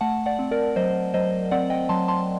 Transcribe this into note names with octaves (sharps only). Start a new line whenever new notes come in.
A3 F#5 A5
D5 F#5
C4
A#4 D5
F#3 C5 D#5
F#3 C5 D#5
C4 D5 F#5
D#5 G5
F#3 A5 C6
A5 C6